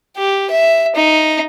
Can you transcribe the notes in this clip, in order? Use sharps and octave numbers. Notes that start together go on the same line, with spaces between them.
G4
E5
D#4